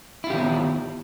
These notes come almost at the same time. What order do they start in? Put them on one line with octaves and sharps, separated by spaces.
E4 F4 G4 D#3 B3